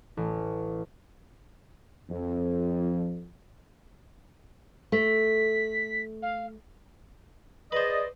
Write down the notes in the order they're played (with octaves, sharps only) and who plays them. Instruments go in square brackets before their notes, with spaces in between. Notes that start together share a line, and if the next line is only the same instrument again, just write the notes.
[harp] A1
[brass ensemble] F2
[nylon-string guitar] A3 [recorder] B6
[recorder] F5
[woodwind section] G#4 D5 D#5 [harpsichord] B4 C5